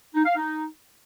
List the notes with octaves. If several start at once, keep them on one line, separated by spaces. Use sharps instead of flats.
D#4
F5
D#4